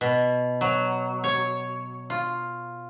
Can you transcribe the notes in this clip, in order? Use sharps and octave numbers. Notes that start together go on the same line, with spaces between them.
B2
F#3
C#5
F4